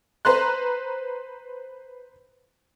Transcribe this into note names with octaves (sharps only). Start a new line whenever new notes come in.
B4 C5 A#5 C6 F#6